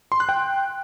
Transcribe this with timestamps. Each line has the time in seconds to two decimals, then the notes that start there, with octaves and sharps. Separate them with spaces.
0.12 C6
0.20 F#6
0.29 G5